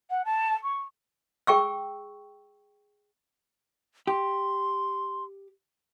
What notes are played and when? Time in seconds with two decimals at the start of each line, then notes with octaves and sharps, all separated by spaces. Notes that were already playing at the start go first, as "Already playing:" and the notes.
0.10 F#5
0.25 A5
0.63 C#6
1.47 G#4 G5 C#6 E6
4.07 G4 C6